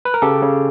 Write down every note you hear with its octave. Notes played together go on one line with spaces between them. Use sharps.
B4
A#4
C#3 G4 A4
C#3